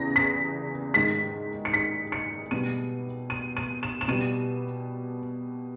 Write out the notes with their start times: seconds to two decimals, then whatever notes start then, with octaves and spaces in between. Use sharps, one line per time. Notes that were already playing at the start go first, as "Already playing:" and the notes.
Already playing: E2 C#3 E3 A#6
0.16 B6
0.94 G#2 D#3 G#3 B6
1.65 C#7
1.73 B6
2.12 C#7
2.51 B2 G3 D#7
3.30 D#7
3.57 D#7
3.83 E7
4.01 E7
4.08 B2 G3 D#7